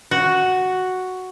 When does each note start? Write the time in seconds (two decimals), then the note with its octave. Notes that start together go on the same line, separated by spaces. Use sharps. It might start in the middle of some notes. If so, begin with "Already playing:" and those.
0.11 F#4